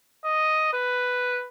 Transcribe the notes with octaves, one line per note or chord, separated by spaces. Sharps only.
D#5
B4